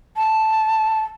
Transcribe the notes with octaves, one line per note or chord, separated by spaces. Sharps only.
A5